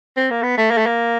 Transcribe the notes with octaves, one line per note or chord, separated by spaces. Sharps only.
C4
A#3
B3
A3
A#3
A3
A#3